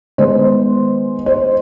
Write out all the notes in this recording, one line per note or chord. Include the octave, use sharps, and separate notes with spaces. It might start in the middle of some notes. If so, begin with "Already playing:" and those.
D#3 G#3 B3 C5
C5